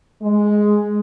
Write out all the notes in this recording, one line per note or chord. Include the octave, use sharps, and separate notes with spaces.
G#3